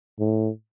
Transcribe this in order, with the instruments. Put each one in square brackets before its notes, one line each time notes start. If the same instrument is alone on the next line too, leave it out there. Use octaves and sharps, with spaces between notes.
[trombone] A2